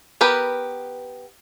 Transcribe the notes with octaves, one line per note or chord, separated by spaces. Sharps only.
B3 G4 A#4 B4